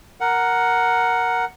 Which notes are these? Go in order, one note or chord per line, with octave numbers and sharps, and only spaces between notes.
A#4 F#5